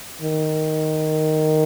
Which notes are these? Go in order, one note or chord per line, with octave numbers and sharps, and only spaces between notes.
D#3